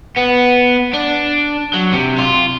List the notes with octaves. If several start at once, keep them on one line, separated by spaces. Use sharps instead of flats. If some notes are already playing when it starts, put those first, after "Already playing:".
B3
D4
F#3
C3
F4